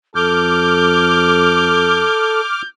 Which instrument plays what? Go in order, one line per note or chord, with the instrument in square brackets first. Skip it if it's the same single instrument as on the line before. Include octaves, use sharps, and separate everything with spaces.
[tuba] F2 [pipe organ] A4 [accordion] D6 F6 [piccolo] G6